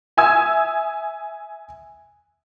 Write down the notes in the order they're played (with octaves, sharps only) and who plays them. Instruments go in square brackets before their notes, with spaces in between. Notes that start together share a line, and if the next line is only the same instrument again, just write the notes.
[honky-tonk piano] E5 G#5 D#6 E6 G#6